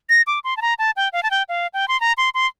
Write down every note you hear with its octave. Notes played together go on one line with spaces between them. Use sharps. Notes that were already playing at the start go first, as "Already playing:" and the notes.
A#6
D6
C6
A5
A#5
A5
G5
F5
A5
G5
F5
G5
C6
A#5
C6
C6